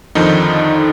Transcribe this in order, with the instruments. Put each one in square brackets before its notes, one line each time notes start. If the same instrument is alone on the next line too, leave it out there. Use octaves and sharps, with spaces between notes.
[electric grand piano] F2 D3 D#3 F3 D#4